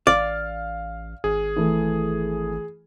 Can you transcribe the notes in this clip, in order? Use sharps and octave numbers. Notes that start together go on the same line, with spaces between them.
A1 D5 F5 F6
G#1 G#4
E3 A3